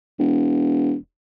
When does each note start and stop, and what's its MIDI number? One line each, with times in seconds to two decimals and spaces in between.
0.19 0.94 28